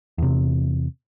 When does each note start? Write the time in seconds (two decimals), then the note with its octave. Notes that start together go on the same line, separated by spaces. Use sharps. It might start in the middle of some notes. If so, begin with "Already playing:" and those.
0.18 E2 C3